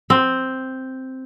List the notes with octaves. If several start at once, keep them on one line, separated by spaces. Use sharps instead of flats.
C4